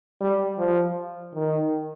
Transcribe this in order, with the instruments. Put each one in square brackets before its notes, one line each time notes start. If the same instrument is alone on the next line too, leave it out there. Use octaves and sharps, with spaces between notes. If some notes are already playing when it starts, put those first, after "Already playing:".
[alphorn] G3
F3
D#3